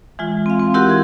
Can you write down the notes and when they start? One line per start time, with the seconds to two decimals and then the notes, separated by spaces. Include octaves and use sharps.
0.19 E3 G#3 F4
0.46 C4 F5
0.60 C4
0.74 E4 F#4 G4 A#4 F#5 C6
0.87 E3 G#6